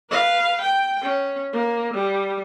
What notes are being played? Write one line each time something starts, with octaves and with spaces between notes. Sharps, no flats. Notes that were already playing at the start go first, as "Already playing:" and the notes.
B4 F5
G5
C#4
A#3
G3